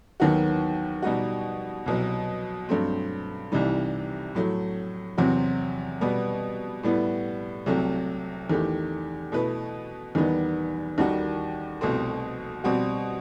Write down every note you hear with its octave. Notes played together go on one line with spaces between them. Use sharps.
D#2 D#3 F#3 B3 F#4
B2 G3 D#4 F#4
C2 B2 F#3
G2 F#3 A3 C4
C2 C3 E3 G3 D#4
A2 F#3 A3
E2 C3 F#3 C4 F#4
B2 G3 B3
A2 G3 B3 E4
C2 C3 F#3 A3
E2 D#3 A3 E4 G4
B2 A3 E4 B4
E2 D#3 G3 B3 D#4
D#2 D#3 G3 D#4 F#4
C2 B2 A3 C4
B2 G3 C4 F#4